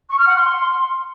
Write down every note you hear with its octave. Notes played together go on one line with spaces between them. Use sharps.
C#6
F6
F#5
C6